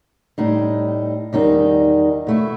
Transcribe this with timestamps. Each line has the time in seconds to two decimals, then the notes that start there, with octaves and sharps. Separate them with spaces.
0.38 A2 G3 D#4
1.33 E2 D#3 G3 D#4
2.27 B2 A3 E4